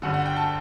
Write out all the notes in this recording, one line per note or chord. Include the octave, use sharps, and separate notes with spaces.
G1 G2 D3 F#5
F#5
G5
A5